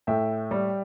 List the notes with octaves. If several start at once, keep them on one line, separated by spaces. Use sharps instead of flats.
A2 E5 G5
G3